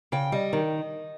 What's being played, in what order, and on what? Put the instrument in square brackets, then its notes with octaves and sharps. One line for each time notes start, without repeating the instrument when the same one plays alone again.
[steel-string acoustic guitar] C#3 G5
G3 D#5
D#3